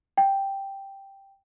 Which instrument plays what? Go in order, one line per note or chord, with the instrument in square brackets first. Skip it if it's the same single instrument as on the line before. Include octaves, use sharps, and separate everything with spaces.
[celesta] G5